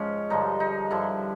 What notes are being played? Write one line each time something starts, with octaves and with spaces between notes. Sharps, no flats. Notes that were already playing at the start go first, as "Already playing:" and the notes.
Already playing: G#2 F3 C#4
G2 D3 F3 D#4
D#4
G2 D3 F3 E4